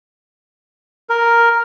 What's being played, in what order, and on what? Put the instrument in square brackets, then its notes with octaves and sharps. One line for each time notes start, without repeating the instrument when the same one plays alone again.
[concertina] A#4